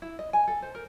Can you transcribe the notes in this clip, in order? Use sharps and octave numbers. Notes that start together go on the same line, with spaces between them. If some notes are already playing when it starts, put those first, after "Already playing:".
E4
D#5
G#5
A4
C5
A#4